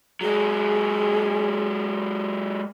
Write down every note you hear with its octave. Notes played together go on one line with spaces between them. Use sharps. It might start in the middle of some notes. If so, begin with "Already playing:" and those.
F#3 G#3 G#4